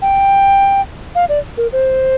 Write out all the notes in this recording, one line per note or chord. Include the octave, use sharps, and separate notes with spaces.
G5
F5
D5
A#4
C5